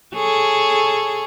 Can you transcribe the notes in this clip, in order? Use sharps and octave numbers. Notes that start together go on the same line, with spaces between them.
G#4 A4 C#5